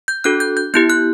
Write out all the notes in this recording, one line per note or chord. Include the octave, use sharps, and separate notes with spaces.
G6
D4 F#4 A4 F#6
G6
G6
B3 E4 G4 G6
F#6